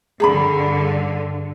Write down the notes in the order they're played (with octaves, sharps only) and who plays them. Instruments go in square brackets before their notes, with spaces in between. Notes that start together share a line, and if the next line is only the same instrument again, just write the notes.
[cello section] G2 D3 [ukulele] G#4 A#5 B5